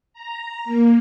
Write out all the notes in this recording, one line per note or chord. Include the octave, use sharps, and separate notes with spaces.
A#5
A#3